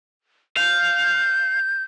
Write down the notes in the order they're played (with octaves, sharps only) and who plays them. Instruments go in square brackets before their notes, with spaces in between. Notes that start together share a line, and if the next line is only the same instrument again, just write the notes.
[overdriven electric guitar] F5 [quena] G6